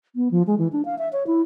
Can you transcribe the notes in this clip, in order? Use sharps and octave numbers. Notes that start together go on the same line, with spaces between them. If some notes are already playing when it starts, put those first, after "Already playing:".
B3
F3
G#3
E3
D4
F5
E5
C#5
E4